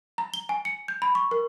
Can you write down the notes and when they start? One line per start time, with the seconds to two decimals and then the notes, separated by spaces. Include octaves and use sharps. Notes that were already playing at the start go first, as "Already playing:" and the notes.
0.18 A#5
0.34 G7
0.49 G#5
0.65 C#7
0.88 G6
1.02 B5
1.15 C#6
1.31 A#4